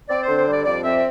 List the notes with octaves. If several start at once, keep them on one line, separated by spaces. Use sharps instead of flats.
C4 D5
D3 C5
C5
G3 D5
F2 D5
C4 E5